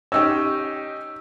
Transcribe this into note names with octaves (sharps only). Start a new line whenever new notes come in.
C#4 D#4 G4 E6